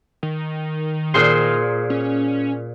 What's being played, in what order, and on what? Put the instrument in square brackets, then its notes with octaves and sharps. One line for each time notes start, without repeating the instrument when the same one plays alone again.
[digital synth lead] D#3
[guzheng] A#2 G#4 C5
[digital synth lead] C#4